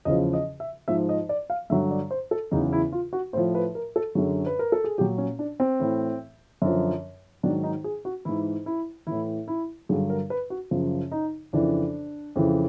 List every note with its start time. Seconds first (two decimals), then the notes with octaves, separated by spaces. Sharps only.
0.05 E2 C#3 F3 D#5
0.33 D#5
0.60 E5
0.88 G#2 F3 E5
1.09 D#5
1.29 D5
1.50 F5
1.70 G2 D3 F#3 E5
1.91 D5
2.11 C5
2.31 A4
2.51 E2 C#3 F#3 D#4
2.73 E4
2.92 F4
3.13 F#4
3.33 A2 C5
3.37 F3
3.55 B4
3.75 A#4
3.96 A4
4.15 F#2 D3 F#3 G#4
4.46 B4
4.59 A#4
4.72 A4
4.84 G#4
4.98 A#2 G4
5.01 F#3
5.18 C#4
5.39 D4
5.60 C4
5.80 A2 E3
6.62 F#2 D3 F3
7.43 G#2 D#3 F#3 D4
7.63 D#4
7.84 G#4
8.05 F#4
8.25 G#2 E3 E4
8.66 E4
9.07 A2 E3 E4
9.48 E4
9.89 G2 D3 F#3 G#4
10.10 A#4
10.30 B4
10.50 F#4
10.71 F#2 C#3 F3
11.12 D#4
11.53 F2 C#3 E3 D4
12.36 F2 C#3 E3